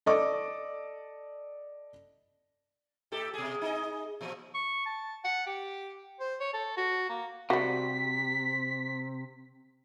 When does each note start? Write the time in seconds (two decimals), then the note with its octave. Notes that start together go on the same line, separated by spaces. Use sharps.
0.06 A4 D5 D#5 D6
3.12 A2 G4 A4
3.34 B2 G#4
3.62 D#4 G#4 D#5
4.21 A#2 F3
4.54 C#6
4.86 A5
5.24 F#5
5.47 G4
6.20 C5
6.40 C#5
6.53 A4
6.77 F#4
7.09 A#3
7.50 C3 G3 F#4 B6